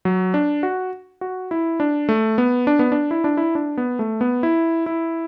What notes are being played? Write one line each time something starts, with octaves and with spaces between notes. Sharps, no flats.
F#3
D4
F#4
F#4
E4
D4
A3
B3
D4
B3
D4
E4
D4
E4
D4
B3
A3
B3
E4
E4